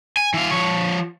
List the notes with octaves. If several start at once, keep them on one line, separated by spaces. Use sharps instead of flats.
G#5
E3 F5
F3 C#5